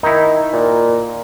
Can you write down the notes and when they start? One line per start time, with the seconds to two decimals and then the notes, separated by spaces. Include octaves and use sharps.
0.03 D#3 D#4 E4
0.53 A#2